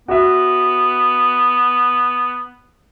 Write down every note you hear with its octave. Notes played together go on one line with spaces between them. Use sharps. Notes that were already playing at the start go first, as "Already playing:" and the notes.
B3 F#4 E5